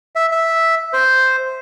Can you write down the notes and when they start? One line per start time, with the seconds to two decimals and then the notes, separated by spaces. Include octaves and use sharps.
0.15 E5
0.32 E5
0.93 C5